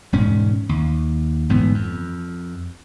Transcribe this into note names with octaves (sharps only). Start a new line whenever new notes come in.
E1 G#2 C#4
D#2
G1 G#2 E3 B3
F2